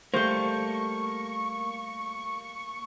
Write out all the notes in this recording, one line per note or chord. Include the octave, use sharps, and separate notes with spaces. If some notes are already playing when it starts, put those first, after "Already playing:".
G3 A3 A#3 C5 C#6